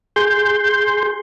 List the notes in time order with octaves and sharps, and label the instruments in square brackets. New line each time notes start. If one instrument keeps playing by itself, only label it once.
[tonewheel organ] G#4 C6 G6